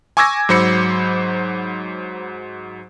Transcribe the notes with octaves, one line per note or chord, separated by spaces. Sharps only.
G#5 C#6 D6 E6 G#6 A#6
G#2 F#3 C5 B5 C#7